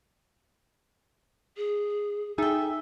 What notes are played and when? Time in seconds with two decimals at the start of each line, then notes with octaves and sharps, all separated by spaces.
1.57 G#4
2.38 D#4 G#4 A4 E5 G5